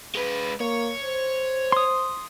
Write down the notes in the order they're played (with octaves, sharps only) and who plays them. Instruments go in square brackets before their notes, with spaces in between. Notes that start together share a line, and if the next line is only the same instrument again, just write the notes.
[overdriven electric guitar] G#3 B4
[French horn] A#3 [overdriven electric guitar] C#5
[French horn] C5
[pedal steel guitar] C6 D#6